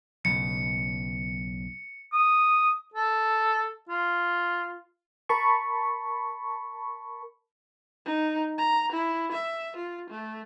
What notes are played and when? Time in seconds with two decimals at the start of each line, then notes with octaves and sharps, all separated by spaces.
0.25 B1 F#2 C#3 C#7
2.12 D#6
2.93 A4
3.89 F4
5.29 A#4 A5 B5 C#6
8.06 D#4
8.58 A#5
8.93 E4
9.32 E5
9.77 F4
10.10 A3